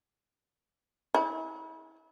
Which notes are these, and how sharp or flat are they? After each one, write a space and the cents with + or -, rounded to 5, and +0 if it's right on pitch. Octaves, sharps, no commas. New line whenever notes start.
E4 -35